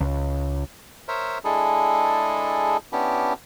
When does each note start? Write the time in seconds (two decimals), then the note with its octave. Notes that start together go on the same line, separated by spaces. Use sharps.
0.01 C#2
1.08 A#4 C5 C#5 E5
1.44 G#3 D4 E4 G#4 A4
2.92 B3 C#4 D4 E4 G4